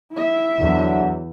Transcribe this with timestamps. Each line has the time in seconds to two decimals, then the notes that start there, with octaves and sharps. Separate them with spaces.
0.12 E4 E5
0.60 E2 D3 F#3